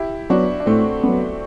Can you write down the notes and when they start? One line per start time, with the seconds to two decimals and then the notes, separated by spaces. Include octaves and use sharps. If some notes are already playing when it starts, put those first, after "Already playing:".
Already playing: E4 G4
0.30 F#3 B3 D4 F#4
0.60 D4
0.66 A2 A3 C4
1.03 F#3 B3